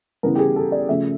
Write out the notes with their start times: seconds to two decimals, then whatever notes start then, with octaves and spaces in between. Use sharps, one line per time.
0.23 C#3 E3 G3 B3 A#4
0.36 G4
0.39 G#4
0.56 A4
0.72 D5
0.89 C#3 F3 A3 E5